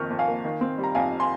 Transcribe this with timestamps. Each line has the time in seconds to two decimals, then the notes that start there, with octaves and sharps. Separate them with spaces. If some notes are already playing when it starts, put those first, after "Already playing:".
Already playing: F2 D#3 A#3 C#6 F6 G6
0.10 F2
0.19 F5 G#5
0.27 A#3
0.44 D#3
0.61 C4
0.78 G3
0.84 A#5
0.95 F2 F5 G#5
1.20 G#5 C6